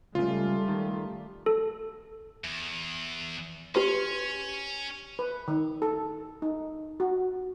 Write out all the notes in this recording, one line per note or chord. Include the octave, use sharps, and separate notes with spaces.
C#2 C#3 G3 A3 F4
D#3
A4
E2
C#4 G4 B4 C6
B4
D#3
A4
D#4
F#4